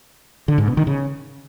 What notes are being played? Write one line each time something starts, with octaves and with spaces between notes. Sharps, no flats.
D3
G#2
B2
D#3
C#3